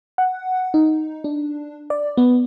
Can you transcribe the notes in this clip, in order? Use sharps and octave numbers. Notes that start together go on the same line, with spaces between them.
F#5
D#4
D4
D5
B3